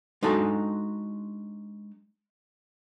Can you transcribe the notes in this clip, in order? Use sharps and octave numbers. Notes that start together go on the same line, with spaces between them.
G#3 D4 D#4 F#4 A4 G#5